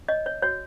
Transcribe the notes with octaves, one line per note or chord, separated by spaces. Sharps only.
C#5 D#5
C#5
F#4 C#5